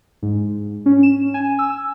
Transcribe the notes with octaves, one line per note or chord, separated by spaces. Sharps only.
G#2
C#4
E7
G#5
E6